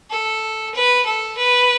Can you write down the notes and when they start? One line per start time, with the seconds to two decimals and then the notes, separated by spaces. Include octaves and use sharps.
0.11 A4
0.75 B4
1.05 A4
1.38 B4